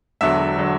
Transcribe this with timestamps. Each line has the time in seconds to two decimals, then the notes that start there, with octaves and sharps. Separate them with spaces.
0.21 E1 E2 D3 F#3 E5
0.58 D3 F#3